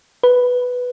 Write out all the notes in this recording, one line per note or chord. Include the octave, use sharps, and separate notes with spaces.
B4